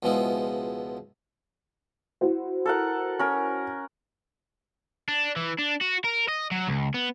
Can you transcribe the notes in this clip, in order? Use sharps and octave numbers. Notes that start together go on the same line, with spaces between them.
C#2 B2 F3 G#3 B3 E4
E4 F#4 C5
A4 A#4 F#5
C#4 A#4
D4
E3
D4
F#4
A#4
D#5
F#3
C#2
B3